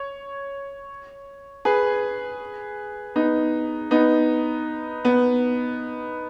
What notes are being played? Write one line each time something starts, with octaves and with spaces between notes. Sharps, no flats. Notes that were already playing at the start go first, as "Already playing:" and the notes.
Already playing: C#5
G#4 B4
B3 D#4
B3 D#4
B3